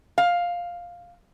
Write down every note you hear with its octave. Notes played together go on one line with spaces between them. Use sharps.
F5